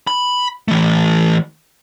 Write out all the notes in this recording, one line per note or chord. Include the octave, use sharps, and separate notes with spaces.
B5
E3 A3